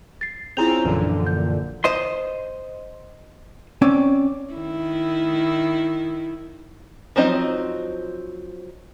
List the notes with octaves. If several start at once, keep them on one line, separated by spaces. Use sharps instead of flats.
A6 C7
C4 C#4 E4 F4 G#4 A#5 G6 F7
A#1 F#2 A#2 D3 E3 F3
G6
C5 D#5 C6
C4 C#4 D5
D#3 E4
F3 F#3 C4 D#4 D#5